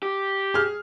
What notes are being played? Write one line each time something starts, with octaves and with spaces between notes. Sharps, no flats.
G4
G#4 F6